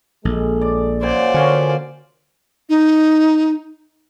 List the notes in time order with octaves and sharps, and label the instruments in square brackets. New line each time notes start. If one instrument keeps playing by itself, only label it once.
[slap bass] A#1 [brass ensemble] G#3 A4
[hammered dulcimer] D5
[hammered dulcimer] F#2 A#2 [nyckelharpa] C5 D5
[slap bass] D3 [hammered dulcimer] F3 C#4 F#4 [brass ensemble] A#3 G#5
[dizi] D#4